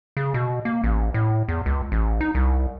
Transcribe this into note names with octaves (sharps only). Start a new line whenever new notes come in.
C#3
B2
A#3
A1
A2
E2
C#2
A1
D#4
C2